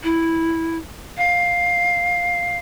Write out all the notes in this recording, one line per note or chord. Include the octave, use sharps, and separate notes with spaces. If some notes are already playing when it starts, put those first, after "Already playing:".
E4
F5